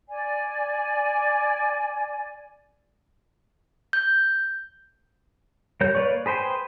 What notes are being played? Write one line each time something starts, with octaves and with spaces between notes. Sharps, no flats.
D5 G#5
G6
G3 A#4 C#5 G6
A#3 B4 C#5 D5 C#6
G#4 B4 C5 G5 G#5